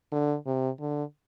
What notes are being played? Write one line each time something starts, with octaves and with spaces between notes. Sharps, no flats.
D3
C3
D3